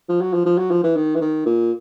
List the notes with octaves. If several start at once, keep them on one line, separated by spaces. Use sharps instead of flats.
F3
F#3
F3
F3
F#3
F3
E3
D#3
E3
D#3
A#2